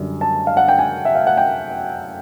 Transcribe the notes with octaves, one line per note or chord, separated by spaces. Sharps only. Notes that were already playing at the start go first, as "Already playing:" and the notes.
Already playing: F#2 D3 G3
A5
F5
F#5
G5
G#5
E5
F5
F#5
G5